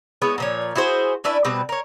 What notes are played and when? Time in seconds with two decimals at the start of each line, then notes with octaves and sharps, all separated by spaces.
0.22 G#3 B3 E4 C#5
0.38 A#2 F3 C#5
0.75 E4 F#4 G#4 C5
1.24 C#4 D4 E4 B4
1.45 B2 G3 C4 B4
1.69 A#4 C#5